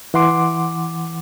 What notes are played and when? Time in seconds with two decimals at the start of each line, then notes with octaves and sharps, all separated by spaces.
0.14 E3 F#5 C6 D6